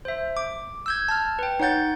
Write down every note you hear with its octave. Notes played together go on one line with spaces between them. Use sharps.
C5 E5
D6
E6 G6 G#6
A5 F6
B4 G5
D#4 C#5 F#5 G6 A6